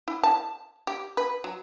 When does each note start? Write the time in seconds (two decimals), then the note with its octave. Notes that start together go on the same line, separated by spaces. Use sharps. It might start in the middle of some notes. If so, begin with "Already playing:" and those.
0.08 E4
0.23 A5
0.87 G4
1.17 B4
1.44 F#3